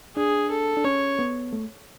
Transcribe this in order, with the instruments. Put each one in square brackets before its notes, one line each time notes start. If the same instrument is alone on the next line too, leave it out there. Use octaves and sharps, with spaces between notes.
[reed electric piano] D4 [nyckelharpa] G#4
[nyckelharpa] A4
[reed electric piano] D4
[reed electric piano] C#4 [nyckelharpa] C#5
[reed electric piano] B3
A3